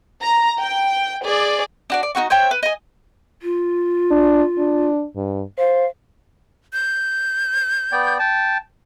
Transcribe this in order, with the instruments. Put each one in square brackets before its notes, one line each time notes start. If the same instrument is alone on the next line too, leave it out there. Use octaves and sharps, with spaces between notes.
[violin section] A#5
G5
G#4 D5
[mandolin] D4 F#4 D5
D5
D#4 E4 F#4 C#6
C5 C#5 E5 G5
B4
D#5 G#5
[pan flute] F4
[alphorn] D4
D4
G2
[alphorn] C5 [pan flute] F5
[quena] G6
[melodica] B3 D5 G5
G5 A5